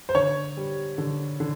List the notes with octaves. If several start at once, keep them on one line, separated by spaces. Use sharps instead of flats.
C5
D3 C#5
G3
D3
D3